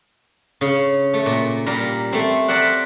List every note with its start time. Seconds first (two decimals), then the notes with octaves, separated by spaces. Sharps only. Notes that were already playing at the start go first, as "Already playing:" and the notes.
0.61 C#3
1.14 A3
1.26 A#2
1.66 A#2 G3 A#4
2.12 A3 C4
2.48 G4 A#4 C5 D5 E5 F#5